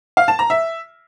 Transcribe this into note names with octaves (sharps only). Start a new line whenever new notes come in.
F5
A5
A#5
E5